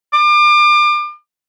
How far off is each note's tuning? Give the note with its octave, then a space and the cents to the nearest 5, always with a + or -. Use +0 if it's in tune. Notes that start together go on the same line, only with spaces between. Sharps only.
D6 +35